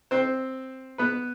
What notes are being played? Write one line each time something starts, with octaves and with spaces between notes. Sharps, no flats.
C4 C5
B3 B4